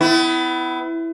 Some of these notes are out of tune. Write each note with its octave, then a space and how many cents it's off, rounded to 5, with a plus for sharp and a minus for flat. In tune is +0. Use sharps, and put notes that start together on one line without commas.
B3 +35 E4 +0